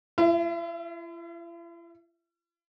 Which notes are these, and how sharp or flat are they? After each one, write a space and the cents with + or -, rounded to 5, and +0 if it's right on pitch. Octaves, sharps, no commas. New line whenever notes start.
E4 +45 E5 +0